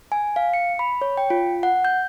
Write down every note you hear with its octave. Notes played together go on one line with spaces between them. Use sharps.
G#5
F5
C#7
B5
C#5
G5
F4
F#5
G6